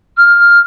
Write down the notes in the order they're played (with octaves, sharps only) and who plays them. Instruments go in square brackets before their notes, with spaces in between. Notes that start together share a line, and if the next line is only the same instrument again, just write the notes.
[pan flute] F6